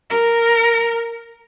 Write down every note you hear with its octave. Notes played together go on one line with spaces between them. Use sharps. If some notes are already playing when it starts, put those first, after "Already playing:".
A#4